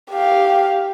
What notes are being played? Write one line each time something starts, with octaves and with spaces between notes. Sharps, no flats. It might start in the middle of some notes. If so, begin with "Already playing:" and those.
G4 F5